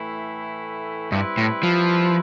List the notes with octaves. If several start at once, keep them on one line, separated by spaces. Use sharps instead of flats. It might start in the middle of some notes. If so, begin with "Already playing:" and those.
Already playing: A2 E3 A3 E4
G2 G3 C4 E4 B4
A2
F3